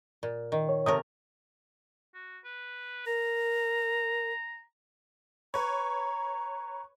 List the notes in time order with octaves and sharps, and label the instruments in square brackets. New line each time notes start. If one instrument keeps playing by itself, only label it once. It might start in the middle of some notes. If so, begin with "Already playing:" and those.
[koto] A#2
D#3
[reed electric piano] C#5
[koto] C3 A3 A#4 [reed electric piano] C#5 D#6
[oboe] F#4
B4
[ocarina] A#4 [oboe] A#5
[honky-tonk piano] B4 C#5 [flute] A#5